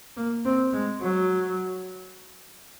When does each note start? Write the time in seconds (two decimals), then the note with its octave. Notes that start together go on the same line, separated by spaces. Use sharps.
0.17 A#3
0.45 C4
0.73 G#3
1.01 F#3